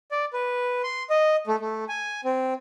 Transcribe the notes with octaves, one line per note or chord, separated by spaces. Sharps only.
D5
B4
C6
D#5
A3
A3
G#5
C4